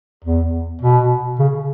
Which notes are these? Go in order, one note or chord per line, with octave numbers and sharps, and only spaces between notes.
E2
B2
C#3